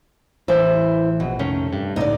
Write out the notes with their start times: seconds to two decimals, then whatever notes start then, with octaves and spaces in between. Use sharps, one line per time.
0.48 A1 E3 E4 C5
1.20 A#1 B2
1.39 F1 D#3 A3 C#4
1.73 G2
1.96 C#2 A2 D3 D#4 D5